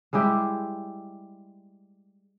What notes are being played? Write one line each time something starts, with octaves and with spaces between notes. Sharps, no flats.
G3 G#3 E4 G4